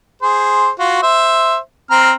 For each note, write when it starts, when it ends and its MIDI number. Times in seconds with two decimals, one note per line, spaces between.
0.22 0.70 68
0.22 0.70 72
0.79 0.98 65
0.79 0.98 66
1.02 1.57 72
1.02 1.57 76
1.91 2.12 60
1.91 2.12 82
1.91 2.12 89